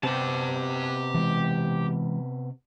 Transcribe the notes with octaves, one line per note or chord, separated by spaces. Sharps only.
C3 B3 C4 G4 A5
E3 G#3